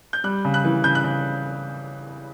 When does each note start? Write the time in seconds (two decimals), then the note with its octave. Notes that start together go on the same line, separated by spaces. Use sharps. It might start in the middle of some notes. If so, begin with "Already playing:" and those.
0.13 G6
0.24 G3 F#6
0.45 C#3
0.54 F#6
0.64 E3
0.84 C#3 G6
0.95 F#6
1.04 C#3